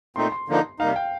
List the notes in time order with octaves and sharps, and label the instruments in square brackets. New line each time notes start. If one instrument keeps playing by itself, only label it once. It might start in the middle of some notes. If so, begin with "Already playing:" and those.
[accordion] A#2 A3 C4 D#4 [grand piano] C6
[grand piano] C6
[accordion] D3 F3 A#3 D#4
[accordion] C3 G3 A#3 D#4 [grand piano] F5
[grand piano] G5